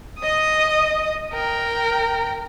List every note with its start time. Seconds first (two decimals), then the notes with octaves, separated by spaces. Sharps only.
0.19 D#5 D#6
1.34 A#4 G5